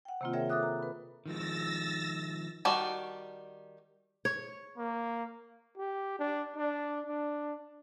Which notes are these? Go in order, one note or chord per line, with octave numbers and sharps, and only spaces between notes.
F#5 G5
C3 D#3 A#3 C4 F4
G#4 A#4 C#5 E5 G5
A4 C#5 E5 D6 D#6 F#6
A#5
B4 B5
D#3 F3 G#3 E6 A6 A#6
D#3 G3 F#4 D5 A5
C#5
A#3
G4
D4
D4
D4